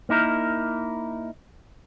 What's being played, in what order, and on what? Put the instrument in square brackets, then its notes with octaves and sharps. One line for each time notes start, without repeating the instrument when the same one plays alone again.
[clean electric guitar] A#3 D#4 E4 A#4